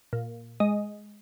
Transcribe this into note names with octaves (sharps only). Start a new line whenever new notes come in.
A#2
G#3 D#5